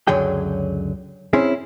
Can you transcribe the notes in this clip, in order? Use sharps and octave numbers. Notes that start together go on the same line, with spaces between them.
C#2 F#2 D3 F#3 G#4 G5
C4 C#4 E4 G#4